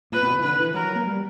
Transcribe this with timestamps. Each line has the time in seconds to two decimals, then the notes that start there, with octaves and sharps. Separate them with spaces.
0.12 A#2 B4
0.23 B2
0.33 D3
0.39 E3
0.43 D3 B4
0.59 E3
0.74 F#3 A#4
0.95 A#3
1.07 G3